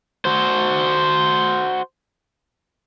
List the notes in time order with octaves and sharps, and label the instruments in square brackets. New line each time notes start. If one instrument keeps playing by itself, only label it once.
[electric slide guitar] F#4 C5